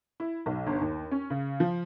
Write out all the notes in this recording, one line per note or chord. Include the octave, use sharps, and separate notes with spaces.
E4
B1
G1
D#2
C#4
C#3
F3